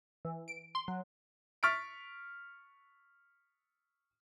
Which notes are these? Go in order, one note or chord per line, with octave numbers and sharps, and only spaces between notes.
E3
D7
C6
F#3
C#6 F6 A6 B6 D7